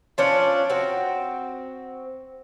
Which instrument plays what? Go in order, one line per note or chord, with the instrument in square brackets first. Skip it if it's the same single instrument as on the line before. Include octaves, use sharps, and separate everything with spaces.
[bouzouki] F3 C#4 D4 F5
C4 F#4